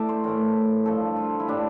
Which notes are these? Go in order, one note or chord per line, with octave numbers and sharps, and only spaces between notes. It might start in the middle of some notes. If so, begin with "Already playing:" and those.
Already playing: E3 A3 D5 E5
C5
A2 E3 A3 A#4
G2 F3 A3 A4
F4
E4
A2 G3 A#3 D4